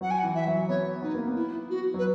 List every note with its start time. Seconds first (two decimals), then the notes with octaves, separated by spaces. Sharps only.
0.01 F#3 F#5
0.10 G#5
0.18 F#5
0.23 E3
0.35 E5
0.47 F#3
0.68 B3 C#5
1.02 B3 D#4
1.15 A#3
1.27 B3
1.35 E4
1.70 F#4
1.94 F#3
1.98 B4